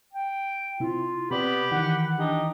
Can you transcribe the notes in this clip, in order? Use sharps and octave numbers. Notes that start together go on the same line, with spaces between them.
G5
C3 E4 F4
C3 B3 G4 D5 B5
D#3 E3 F#5
D4 D#4 G4